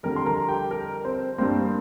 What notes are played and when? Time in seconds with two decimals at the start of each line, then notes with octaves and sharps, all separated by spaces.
0.03 F2 D3 G3 A#4
0.16 C6
0.26 A#4 A#5
0.48 G4 G5
0.71 A#4
1.05 C4 C5
1.38 G2 G3 A#3 C4 C5